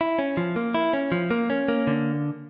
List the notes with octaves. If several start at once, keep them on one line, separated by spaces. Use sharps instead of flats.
E4
C#4
F3
A#3
E4
C#4
F3
A#3
C#4
A#3
D3